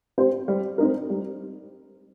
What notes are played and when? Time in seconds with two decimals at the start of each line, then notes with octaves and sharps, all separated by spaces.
0.18 C4 G4 C5
0.48 G3
0.78 C4 D#4 A#4
1.10 G3